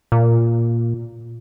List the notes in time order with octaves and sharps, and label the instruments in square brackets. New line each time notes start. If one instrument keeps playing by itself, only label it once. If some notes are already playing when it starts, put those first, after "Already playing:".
[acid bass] A#2